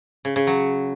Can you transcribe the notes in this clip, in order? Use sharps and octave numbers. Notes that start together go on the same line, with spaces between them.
C#3
C#3
F#3